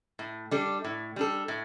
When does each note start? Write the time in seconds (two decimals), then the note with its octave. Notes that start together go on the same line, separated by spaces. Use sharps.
0.19 A2
0.51 G3 D4 A4
0.84 A2
1.16 G3 D4 A4
1.48 A2